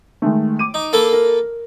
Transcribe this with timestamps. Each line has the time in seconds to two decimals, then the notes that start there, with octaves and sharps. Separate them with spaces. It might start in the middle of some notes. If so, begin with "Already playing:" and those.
0.22 D#3 G#3 A3
0.59 D6 D#7
0.74 D#4
0.93 A#3 A4 B4
1.13 A#4